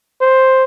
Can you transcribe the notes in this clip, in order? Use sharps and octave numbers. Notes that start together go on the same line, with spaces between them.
C5